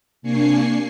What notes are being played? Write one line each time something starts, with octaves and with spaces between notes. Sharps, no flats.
C3 A#3 D4 G#5 C#6 C7